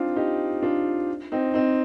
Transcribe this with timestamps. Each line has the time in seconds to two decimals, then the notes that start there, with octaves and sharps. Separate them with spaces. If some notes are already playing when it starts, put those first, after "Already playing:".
Already playing: C4 D4 D#4 F4
0.16 D#4 G4
0.63 D4 F4
1.32 C4 D#4
1.54 C4 D#4